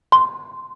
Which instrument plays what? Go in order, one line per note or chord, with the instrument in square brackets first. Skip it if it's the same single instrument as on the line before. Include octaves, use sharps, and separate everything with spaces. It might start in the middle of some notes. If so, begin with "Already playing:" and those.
[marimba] C6